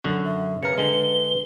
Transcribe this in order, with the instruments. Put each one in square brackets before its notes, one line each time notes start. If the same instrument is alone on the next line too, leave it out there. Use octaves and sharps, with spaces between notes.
[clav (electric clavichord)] F#2 D3 F#4
[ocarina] E5
[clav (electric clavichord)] C#3 A#4 [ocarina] B4 [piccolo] C#7
[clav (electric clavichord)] D3 G#3 [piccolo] G7